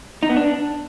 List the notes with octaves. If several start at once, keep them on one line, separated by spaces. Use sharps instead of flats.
D#4
B3
D4